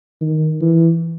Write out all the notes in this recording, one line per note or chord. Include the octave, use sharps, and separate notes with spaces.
D#3
E3